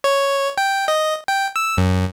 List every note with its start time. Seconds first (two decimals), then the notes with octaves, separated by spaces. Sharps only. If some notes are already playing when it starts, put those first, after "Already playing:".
0.04 C#5
0.58 G5
0.88 D#5
1.28 G5
1.56 E6
1.77 F#2